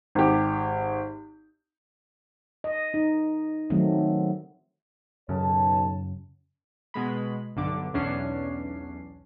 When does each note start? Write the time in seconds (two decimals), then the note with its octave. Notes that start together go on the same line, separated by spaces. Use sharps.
0.15 G#1 G4
2.64 D#5
2.94 D#4
3.70 D#3 F#3 A3 C4
5.29 B1 F#2 C#3 C#5 A5
6.94 B2 G#3 B5
7.56 B1 G2 D3 D6
7.94 B1 E2 C#4 D4 C7